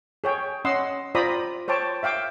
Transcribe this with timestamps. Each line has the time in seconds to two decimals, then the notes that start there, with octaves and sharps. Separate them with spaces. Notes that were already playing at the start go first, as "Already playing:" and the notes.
0.24 G#4 C#5 G5
0.65 C#4 D#5 F#5 C6 E6
1.15 F4 C5 D5 A#5 B5 D#6
1.68 C5 C#5 G5 A5 D6
2.03 E5 F5 G5 D6